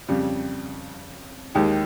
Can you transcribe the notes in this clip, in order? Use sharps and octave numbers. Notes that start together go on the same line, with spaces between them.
F2 C#3 G3
D#2 D#3 G#3 D#4 G4